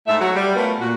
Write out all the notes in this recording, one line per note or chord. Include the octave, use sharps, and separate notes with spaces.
G#2 A3 A4 E5
F#3 A3 F#4
G3
A3 B3 C#4 F4 A#4 B4
A#2 F#4